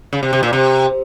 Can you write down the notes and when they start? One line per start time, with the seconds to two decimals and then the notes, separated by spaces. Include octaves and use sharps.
0.13 C#3
0.23 C3
0.33 C3
0.43 A#2
0.53 C3